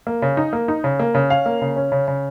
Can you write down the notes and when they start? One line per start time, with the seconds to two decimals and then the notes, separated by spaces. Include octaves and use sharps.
0.07 A#3
0.22 C#3
0.37 D#4
0.53 A#3
0.68 D#4
0.84 C#3
1.00 A#3
1.15 C#3
1.30 C#4 F5
1.46 A#3
1.62 C#3
1.76 C#4
1.92 C#3
2.08 C#3